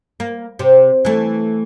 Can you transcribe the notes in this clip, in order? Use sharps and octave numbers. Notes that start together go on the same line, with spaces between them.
A#3
C3
E3 A3